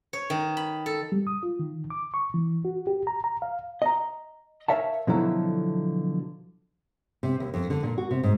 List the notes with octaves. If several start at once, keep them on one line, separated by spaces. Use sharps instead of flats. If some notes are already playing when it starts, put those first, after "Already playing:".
C#5
D#3
B5
A4
G3
D#6
F4
D#3
D6
C#6
E3
F#4
G4
A#5
A#5
F5
D#5 A#5
A#4 C#5 E5 F5 A5
B2 D3 F3 F#3 E4 A4
C3
D#2
F2
D3
A#2
F#4
C3
G#2